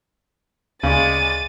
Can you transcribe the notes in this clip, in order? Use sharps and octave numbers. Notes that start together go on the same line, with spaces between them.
D2 C#3 G#3 D5 A6 D#7